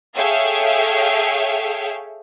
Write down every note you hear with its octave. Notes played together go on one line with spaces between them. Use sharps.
G#4 A4 C#5 E5 F5 G5